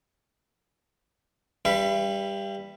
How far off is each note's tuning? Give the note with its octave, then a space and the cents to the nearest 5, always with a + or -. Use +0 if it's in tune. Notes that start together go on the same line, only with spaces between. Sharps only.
G3 +15 B4 -5 F5 -45